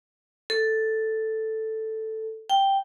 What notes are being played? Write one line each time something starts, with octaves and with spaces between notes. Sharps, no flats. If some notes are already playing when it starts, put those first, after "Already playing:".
A4
G5